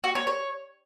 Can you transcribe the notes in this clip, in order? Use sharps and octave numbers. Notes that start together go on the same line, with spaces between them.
F#4
C#5
C#5